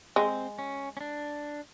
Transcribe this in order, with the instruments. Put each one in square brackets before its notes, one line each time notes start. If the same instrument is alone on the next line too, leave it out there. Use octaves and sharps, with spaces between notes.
[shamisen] G#3 [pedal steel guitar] C4
[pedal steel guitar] C#4
C#4
D4